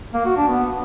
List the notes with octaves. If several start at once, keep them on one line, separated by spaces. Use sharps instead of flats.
A#3
F#4
D4
B3